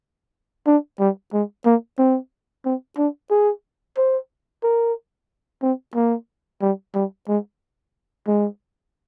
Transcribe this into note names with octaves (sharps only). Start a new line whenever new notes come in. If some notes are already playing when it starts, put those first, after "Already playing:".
D4
G3
G#3
A#3
C4
C4
D4
G#4
C5
A#4
C4
A#3
G3
G3
G#3
G#3